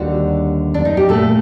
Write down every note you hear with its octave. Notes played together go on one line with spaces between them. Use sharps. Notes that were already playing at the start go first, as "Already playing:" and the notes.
Already playing: D#2 D3 G3 F#4
D4
D#4
G4
A#2 A3 A4